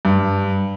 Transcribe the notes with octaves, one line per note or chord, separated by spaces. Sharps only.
G2